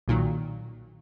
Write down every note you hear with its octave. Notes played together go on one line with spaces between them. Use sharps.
B1 A#2 D#3 F#3